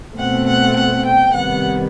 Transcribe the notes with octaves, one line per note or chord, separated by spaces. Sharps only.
B2 A3 C4 F#5
F#5
F#5
G5
C3 D#3 G3 B3 F#5